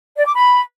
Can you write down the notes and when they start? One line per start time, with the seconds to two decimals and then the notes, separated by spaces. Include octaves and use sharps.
0.17 D5
0.26 D6
0.34 B5